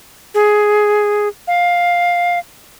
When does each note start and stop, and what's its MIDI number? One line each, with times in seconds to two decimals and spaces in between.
0.34 1.28 68
1.47 2.39 77